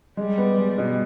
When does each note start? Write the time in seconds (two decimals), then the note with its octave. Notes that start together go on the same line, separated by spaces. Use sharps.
0.17 G3 G#3
0.38 B3
0.58 G#3
0.78 B2